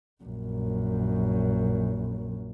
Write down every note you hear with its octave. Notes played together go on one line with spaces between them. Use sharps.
A#1 F#2